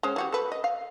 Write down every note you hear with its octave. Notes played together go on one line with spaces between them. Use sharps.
G#3 C#4 C5
E3 F#4 G4
A4 B4
D#5
F5